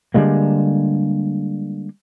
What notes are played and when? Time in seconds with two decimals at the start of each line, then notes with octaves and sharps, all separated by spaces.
0.14 D3 G3 G#3 A#3